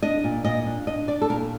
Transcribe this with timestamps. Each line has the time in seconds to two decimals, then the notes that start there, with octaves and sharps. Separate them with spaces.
0.02 D4 D#5
0.24 A#2
0.45 A#2 D#5
0.66 D4
0.87 D4 D#5
1.08 D4 D5
1.22 A4
1.29 A#2 A#4